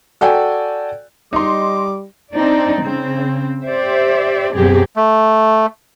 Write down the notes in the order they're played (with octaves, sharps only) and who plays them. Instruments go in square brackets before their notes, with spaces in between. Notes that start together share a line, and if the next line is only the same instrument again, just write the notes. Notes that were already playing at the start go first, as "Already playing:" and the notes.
[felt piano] F#4 A4 D5 G5 G#5
[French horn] G3 [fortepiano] D#4 [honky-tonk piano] D#5 C6 [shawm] D6
[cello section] C4 D4 D#4 D5
C#3 C4
G4 C5 D5 E5
F#2 B2 F#3 C4 G4 G#4
[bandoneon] A3